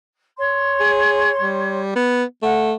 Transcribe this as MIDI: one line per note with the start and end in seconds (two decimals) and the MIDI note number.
0.38 1.79 73
0.38 1.79 84
0.80 1.30 68
1.41 1.94 55
1.95 2.24 59
2.42 2.74 57
2.42 2.70 78